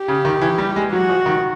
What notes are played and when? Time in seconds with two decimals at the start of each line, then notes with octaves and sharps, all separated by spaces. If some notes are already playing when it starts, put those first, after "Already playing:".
Already playing: G4
0.08 C#3
0.25 D#3
0.42 E3
0.58 G3
0.76 G#3
0.92 F#3 F#4
1.09 F3
1.26 D#3